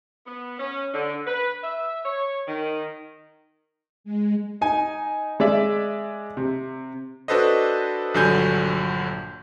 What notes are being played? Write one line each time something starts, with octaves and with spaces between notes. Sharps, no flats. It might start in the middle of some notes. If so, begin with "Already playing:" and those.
B3
C#4
D3
B4
E5
C#5
D#3
G#3
D#4 G#5
G#3 D5 E5
C3
D4 F#4 A4 B4 C5 D#5
A#1 G2 D3 F#3 G#5 G6